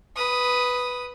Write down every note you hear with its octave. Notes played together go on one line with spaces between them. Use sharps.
B4 D#6